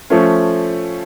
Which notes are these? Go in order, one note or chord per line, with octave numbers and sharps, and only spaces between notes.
F3 A3 C#4